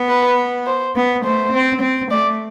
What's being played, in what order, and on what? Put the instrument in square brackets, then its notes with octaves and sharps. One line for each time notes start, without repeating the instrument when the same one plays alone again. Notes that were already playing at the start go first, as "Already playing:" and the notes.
Already playing: [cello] B3
[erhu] B4
C5
[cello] B3
[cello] A3 [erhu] C5
[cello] C4
C4
[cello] A3 [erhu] D5